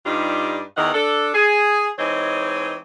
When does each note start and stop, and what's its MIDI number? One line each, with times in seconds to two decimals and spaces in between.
0.06 0.62 43
0.06 0.62 55
0.06 0.62 62
0.06 0.62 63
0.06 0.62 65
0.77 0.94 40
0.77 0.94 51
0.77 0.94 52
0.77 0.94 75
0.77 0.94 78
0.94 1.31 62
0.94 1.31 69
1.35 1.90 68
1.99 2.78 52
1.99 2.78 56
1.99 2.78 60
1.99 2.78 63
1.99 2.78 73